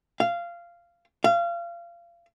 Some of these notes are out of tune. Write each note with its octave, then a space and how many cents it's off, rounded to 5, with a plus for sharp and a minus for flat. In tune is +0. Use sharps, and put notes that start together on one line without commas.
F5 -15
F5 -30